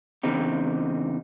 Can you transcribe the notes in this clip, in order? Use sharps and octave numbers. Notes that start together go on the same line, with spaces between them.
E2 C#3 C4 D#4 G4